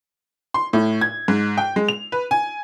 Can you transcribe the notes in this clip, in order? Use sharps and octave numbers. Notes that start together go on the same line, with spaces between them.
C6
A2
G#6
G#2
G5
G#3
F7
B4
G#5